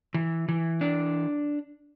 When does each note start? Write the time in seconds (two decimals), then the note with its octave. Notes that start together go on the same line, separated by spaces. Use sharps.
0.14 E3
0.49 E3
0.81 D4